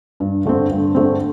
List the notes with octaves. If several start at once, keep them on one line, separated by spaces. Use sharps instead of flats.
G2
D3 A3 C4
G2
D3 A3 C4